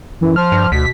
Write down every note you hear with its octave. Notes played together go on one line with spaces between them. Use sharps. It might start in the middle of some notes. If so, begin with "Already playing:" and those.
F#2 E3
F3 F6
G2
D2 B2 B6